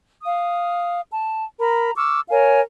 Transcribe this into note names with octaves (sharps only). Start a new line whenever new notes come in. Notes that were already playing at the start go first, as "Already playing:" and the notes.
F5 D#6
A5
A#4 A#5 B5
C#6 D6 E6 F6
A#4 C#5 F5 G#5